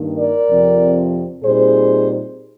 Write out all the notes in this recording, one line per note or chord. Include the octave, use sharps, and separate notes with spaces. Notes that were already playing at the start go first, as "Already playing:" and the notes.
Already playing: G2 D#3 A#3 D#4
A#4 D5
F2 C3 F3 C4
A#2 G3 C4 D#4 G#4 C5